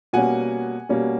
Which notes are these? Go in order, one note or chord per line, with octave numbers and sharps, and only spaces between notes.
B2 G3 A#3 C#4 F#5 G#5
B2 G3 A#3 C#4